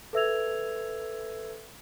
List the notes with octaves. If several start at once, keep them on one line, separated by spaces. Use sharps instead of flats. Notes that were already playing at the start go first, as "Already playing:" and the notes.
A4 B4 E5 E6 G#6 F7